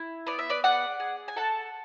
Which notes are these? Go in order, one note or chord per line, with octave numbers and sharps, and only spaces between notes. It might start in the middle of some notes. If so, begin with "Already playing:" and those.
Already playing: E4
B3 D5
E5
B4 D5
G#4 D5 F#5
G#4
G#5
A4 F#5 A5